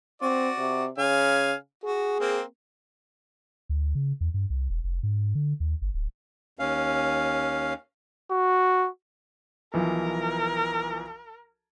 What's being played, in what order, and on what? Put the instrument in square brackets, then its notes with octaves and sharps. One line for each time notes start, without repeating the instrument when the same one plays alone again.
[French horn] C4 [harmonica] F#4 D5
[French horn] C3
[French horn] C#3 [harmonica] F5 G#5
[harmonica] F#4 [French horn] G#4
[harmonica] A#3 C4
[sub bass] D2
C#3
E2
G2
C2
E1
F1
G#2
D3
D#2
G1
D1
[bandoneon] D#2 C#4 F5
[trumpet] F#4
[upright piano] B1 E3 F3 [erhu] A#4